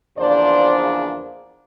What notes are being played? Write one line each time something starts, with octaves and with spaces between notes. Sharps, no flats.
E2 C#3 F3 A#3 D4 C5 D5